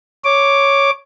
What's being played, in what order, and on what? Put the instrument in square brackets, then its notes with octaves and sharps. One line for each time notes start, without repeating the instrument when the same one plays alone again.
[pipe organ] C#5 D6